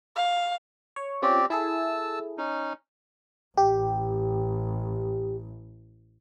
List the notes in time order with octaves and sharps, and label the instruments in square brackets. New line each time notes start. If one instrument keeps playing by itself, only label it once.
[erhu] F5
[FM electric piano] C#5
[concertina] C4 G4 D5 [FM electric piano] C#4 F4
[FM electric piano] E4 G#4 A4 [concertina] A5 E6
[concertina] C#4 D#4
[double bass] A1 [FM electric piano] G4